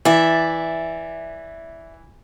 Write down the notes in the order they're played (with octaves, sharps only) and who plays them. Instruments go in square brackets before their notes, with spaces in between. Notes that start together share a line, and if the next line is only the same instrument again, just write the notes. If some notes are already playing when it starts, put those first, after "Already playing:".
[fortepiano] E3 [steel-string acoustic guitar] D5 E5